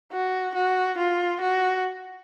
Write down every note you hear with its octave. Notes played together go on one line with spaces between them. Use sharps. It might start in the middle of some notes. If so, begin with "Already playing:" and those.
F#4
F#4
F4
F#4